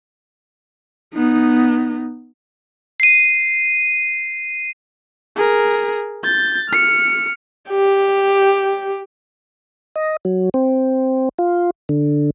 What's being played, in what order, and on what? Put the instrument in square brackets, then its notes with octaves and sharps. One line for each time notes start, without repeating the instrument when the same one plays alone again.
[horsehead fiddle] B3 D#4
[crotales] C7 D#7
[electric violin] G#4 A#4
G6 A6
F6 C#7
[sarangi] G4
[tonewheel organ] D#5
F#3
C4
F4
D3